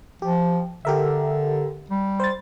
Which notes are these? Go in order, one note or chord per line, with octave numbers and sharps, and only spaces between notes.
F3 G4
D3 G4 A#4 E5
G3
C5 A6